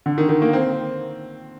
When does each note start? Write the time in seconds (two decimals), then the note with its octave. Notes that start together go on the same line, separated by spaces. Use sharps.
0.06 D3
0.18 D#3
0.29 D#3
0.42 A#3
0.53 C4